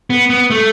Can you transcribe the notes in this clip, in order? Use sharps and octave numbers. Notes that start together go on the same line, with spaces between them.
B3
B3
A3